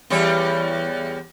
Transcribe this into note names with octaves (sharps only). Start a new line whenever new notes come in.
E2 G3 C#5